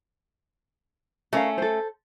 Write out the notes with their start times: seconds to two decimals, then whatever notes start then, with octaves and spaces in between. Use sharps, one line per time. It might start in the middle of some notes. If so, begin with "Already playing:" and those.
1.33 A3 C#4 A#4 F5
1.58 A4 C5